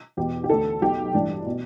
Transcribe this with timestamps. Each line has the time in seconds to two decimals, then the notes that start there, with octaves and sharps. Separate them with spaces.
0.17 E2 B2 G4
0.44 G4
0.50 D2 D3 A4
0.81 B1 B2 G4
1.13 A1 G2 E3 D4
1.46 B2